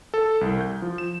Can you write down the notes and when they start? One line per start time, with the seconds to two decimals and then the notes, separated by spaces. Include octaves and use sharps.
0.14 A4
0.41 C2
0.61 G6
0.82 F3
0.98 E7